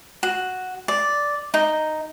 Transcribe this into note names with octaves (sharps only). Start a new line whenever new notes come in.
F#4
D5
D#4